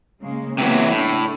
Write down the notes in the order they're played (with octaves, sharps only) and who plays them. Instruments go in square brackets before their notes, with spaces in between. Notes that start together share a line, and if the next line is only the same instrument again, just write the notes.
[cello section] C#3 G#3 A#3
[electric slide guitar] C3 E3 F#3 [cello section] A#3 B3
[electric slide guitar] A2 [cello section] C#3 A3 D4